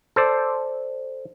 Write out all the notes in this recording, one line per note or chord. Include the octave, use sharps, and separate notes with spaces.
A4 C5 D5